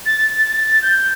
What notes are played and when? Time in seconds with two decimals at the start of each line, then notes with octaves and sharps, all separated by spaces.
0.06 A6
0.82 G6